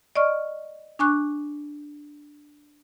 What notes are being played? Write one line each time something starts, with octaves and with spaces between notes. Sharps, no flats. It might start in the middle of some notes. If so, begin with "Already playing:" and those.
D5 D#5 C#6 F6
D4 G#5 C#6 D6 F#6